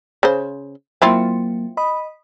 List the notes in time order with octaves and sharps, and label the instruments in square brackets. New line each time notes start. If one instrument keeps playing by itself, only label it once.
[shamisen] C#3 C5
[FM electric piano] F#3 A#3 [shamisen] C4 E4 F4
[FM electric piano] D#5 B5 D#6